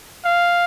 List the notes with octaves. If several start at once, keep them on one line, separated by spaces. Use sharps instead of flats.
F5